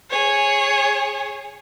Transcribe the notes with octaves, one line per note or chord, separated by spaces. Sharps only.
G#4 C#5